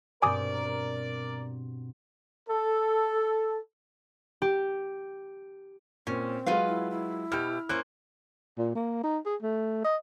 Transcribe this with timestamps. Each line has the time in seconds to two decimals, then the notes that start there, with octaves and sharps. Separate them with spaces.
0.22 G2 B2 C4 A#4 D5 G#5 D6 D#6
2.49 A4
4.42 G4
6.07 A#2 C4 C#4
6.46 F#3 G#3 F4 B4 F5
6.67 E4
6.91 E4
7.32 B2 G4 F6
7.69 A#3 C#4 C5 F#6
8.58 A#2
8.75 A#3
9.03 D#4
9.26 G#4
9.42 A3
9.84 D#5